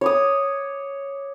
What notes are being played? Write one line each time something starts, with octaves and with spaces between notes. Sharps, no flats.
C#5 D6 D#6